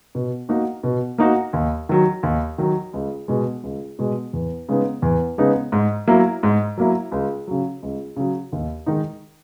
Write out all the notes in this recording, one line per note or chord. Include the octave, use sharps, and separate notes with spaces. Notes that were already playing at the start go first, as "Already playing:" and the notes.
B2
A#3 D#4 F#4
B2
A#3 D#4 F#4
D#2
D#3 F#3
D#2
D#3 F#3
C#2
B2 G#3
C#2
B2 G#3
E2
C#3 G#3 B3 D#4
E2
C#3 G#3 B3 D#4
G#2
F#3 A#3 E4
G#2
F#3 A#3 E4
C#2
C#3 F#3
C#2
C#3 F#3
D#2
D#3 G#3 D#4